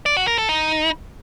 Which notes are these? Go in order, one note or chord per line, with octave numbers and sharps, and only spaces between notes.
D5
F#4
A#4
A4
D#4